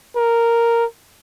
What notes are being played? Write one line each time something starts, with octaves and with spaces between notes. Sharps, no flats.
A#4